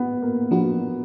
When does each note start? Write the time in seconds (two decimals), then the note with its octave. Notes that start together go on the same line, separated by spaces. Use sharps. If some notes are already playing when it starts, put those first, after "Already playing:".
Already playing: B3
0.22 A#3
0.51 F3 A#3 B3 D4 F#4